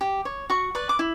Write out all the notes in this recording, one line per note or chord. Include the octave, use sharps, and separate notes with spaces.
G4
C#5
F#4 C#6
B4 D5
D6
E4